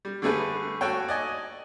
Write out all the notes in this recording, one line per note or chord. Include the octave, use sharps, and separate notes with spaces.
G3
D3 G3 A3 G#4 B4
F#4 A4 C#5 G5
D5 D#5 G#5